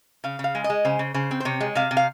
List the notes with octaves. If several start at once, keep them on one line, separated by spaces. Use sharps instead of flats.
C#3 F5
C#3
F5
G#3
D#5
G#3
C#3 C5
C#3
C#3 C5
C4
C5
C3 C#5
G#3
C3 F5
C3
F5